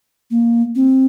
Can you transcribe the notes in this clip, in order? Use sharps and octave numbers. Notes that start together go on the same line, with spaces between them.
A#3
C4